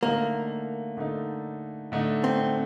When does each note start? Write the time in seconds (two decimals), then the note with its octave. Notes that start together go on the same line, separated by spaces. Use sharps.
0.03 D3 A3 A#3 D#4
0.97 D3 A3 D#4
1.92 D3 A3 D#4
2.24 C4